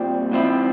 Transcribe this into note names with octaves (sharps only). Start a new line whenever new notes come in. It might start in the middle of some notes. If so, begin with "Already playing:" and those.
Already playing: A#2 G3 C4
G#2 F3 C4 E4